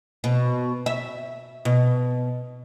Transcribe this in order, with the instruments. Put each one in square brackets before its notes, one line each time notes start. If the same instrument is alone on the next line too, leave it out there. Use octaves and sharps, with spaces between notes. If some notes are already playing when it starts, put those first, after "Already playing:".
[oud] B2
E5
B2